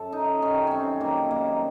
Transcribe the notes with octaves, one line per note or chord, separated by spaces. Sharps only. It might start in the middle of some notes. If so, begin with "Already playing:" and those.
Already playing: F#2 A4
D#4
F#2 D#3 G3 C#4
C4 C#4
F#2 D#3 G3 A#3
A#3